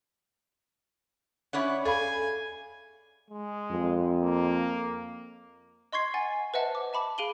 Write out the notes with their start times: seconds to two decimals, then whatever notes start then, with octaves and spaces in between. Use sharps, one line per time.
1.53 C#4 E4 C#5 D5 F#5
1.85 G#4 A4 F5 G#5 B5
3.30 G#3
3.71 F2
4.21 A#3
5.93 D#5 C6 C#6 G#6 C7
6.14 F#5 G#5 A6
6.54 B4 C5 D#5 E5 F#5 A5
6.75 D6
6.93 E5 A5 B5 D6
7.18 G#4 F5 D7 D#7 F#7 G7